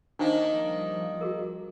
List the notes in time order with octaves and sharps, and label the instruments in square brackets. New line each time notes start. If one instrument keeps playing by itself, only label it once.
[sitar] D#3 A#3 [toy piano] D4 D#4 C5
[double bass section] F3 G3
[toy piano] F#4 G#4 A#4